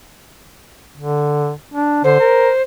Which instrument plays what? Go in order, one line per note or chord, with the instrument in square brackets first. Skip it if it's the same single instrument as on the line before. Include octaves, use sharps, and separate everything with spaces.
[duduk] D3
D4
[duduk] D3 [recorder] C5
[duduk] A#4